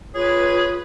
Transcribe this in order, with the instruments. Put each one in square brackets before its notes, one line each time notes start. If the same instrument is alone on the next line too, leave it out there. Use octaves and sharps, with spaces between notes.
[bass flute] F4 [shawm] G#4 [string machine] B4 [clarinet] C#5